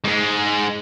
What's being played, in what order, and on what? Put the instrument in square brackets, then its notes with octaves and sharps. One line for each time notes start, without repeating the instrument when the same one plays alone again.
[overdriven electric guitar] G#2 G#3